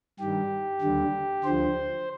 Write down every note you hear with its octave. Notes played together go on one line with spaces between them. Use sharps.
G2 D#3 G3 G4
D#2 D3 G3
D2 D3 F3 C5